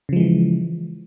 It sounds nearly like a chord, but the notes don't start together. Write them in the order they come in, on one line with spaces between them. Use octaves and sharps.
C#3 F3 G#3 E3